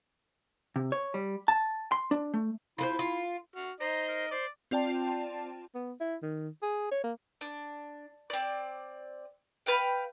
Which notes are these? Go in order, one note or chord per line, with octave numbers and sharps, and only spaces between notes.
C3
C#5
G3
A5
C6
D4
A3
E4 F4 B4 C5
F4
F#4 F6
D#4 C5 D#5 A#5
A#4
C5 D5
C4 F4 D5 G5 A5
B3
E4
D#3
G#4
C#5
A#3
D4
C4 D5
B4 F5 G5